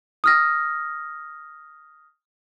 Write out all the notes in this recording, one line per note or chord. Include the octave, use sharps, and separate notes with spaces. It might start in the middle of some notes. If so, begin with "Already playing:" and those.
D#6 F6 A#6